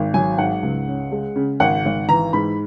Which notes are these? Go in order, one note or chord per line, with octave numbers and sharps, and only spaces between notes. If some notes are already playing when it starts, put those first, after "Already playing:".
Already playing: G#1
F#3 G#5
G#2 F#5
C#2
C#4
G#3
C#3
G#1 F#5
G#1
E3 A#5
G#2 B5